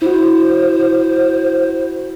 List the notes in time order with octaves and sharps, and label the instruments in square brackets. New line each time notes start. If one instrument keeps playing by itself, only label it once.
[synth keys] E4 F#4 [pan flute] C5